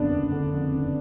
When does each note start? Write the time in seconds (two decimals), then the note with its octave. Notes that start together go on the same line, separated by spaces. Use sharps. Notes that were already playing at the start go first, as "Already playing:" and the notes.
Already playing: F#1 F2 D3 B3 D4
0.10 F#1
0.32 D3
0.53 F2
0.73 F#1